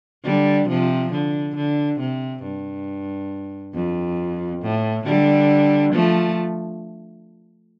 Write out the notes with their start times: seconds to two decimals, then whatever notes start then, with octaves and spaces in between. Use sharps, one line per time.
0.24 D3 G3
0.68 C3 F3
1.12 D3
1.56 D3
2.00 C3
2.43 G2
3.74 F2
4.62 A2
5.06 D3 G3
5.93 F3 A3